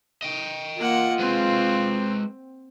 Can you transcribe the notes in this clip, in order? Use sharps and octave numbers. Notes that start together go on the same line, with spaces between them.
D#5 G5
A#3 F4 F#5
G#3 C4 B4